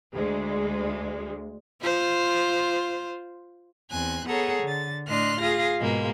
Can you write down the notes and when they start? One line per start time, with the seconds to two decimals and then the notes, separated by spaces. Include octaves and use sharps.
0.14 D2 G#3
1.81 F4 C5
3.92 E2 C4 G#5 F#6
4.28 B3 G#4 A4 C#5 F#5 A#5
4.64 D3 A6
5.09 A2 D4 D#5 C6 F6 F#6
5.40 F4 G#4 F5 A#6
5.80 G#2 B2 G#3 A#3